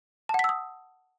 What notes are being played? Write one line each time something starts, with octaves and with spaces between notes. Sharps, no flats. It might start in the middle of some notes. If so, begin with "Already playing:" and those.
F#5 A5 D#6 E6 B6